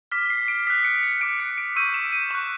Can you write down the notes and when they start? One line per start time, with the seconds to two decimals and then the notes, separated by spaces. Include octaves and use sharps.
0.11 D6 F6 B6
0.30 C7
0.48 D7
0.67 D#6 F#6 B6
0.85 C#7
1.03 C#7
1.21 D6 F#6 D7
1.39 C#7
1.58 D7
1.76 C#6 E6 G6 D#7
1.94 E7
2.12 D#7
2.31 C#6 F#6 E7